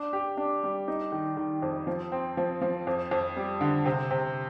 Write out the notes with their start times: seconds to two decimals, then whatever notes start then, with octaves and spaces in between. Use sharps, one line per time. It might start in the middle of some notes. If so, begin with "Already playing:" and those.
Already playing: D4
0.13 G4
0.37 D4
0.63 G3
0.88 D#4
1.12 D#3
1.37 D#3
1.62 F2
1.87 F3
2.12 C4
2.37 F3
2.61 F3
2.87 F2
3.11 F2
3.37 G3
3.61 D3
3.86 C3
4.11 C3